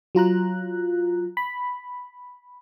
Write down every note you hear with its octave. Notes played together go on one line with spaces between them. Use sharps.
F#3 F4 A#5 F#6
B5